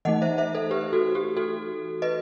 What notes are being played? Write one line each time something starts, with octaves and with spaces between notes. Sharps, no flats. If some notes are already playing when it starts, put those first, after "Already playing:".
E3 A3 D#4 D#5 F#5
C5 E5
C5 E5
A4 C5
G4 B4
F#4 A4
G4
F#4 A4
B4 D#5